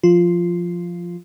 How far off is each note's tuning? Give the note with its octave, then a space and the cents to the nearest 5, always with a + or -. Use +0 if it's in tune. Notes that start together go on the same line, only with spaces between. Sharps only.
F3 +0 F4 -5